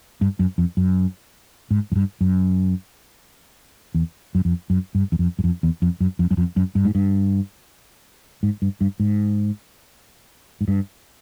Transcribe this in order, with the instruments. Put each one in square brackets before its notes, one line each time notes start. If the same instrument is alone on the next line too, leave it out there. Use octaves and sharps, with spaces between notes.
[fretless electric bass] G2
F#2
F2
F#2
G#2
F#2
G2
F#2
E2
F#2
F2
F#2
G2
E2
F2
F#2
F2
E2
F2
F#2
F2
F#2
F2
F#2
G2
G#2
G2
G#2
G2
G2
G#2
G#2
G2